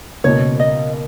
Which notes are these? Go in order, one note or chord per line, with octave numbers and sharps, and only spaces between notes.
C#2 B2 A#3 C#5
D#5